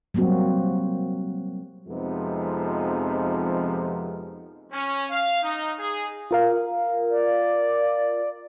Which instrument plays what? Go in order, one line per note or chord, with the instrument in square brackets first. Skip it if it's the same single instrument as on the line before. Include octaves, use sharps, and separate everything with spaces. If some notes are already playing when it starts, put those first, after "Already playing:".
[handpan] F#3 G3 A#3 C4 F#4
[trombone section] F2 C3 F3 G#3 B3 D#4
[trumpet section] C#4
F5
D#4
G#4
[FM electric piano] F4 A#4 F5
[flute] D5